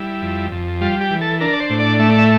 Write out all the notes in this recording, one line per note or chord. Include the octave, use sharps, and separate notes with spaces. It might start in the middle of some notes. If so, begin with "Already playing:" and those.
Already playing: G3 E4
F2
F2
G3 F4
G4
E3
A4
D4 A#4
D5
C5
A2
D5
A3 E5
D5
E5